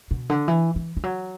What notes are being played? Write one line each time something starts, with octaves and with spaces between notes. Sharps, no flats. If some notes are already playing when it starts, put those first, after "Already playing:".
B2
D3
E3
E3
E3
F#3